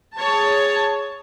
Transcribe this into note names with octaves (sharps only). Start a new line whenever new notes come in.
G#4 C#5 A5